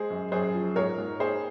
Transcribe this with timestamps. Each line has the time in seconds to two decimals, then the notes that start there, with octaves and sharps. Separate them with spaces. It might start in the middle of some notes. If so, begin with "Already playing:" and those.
Already playing: G#3 G#4 C5
0.10 F#2
0.32 F#2 G#4 C5
0.54 F3
0.76 G#2 A#4 C#5
0.98 G#2
1.20 A#3 G#4 C5